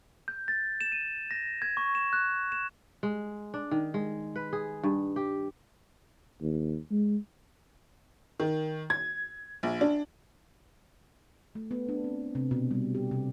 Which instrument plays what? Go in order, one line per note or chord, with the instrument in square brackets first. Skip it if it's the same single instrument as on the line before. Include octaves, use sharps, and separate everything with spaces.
[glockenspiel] G6
A6
E7
D#7
A#6
G#6
C#6
E7
F#6
E7
[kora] G#3
D4
D#3
G#3
B4
G#4
G2
G4
[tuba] D#2
G#3
[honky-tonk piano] D#3
G#6
A#1
D4
[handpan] A3
B3
D4
C4
C3
B2
G3
G4
C3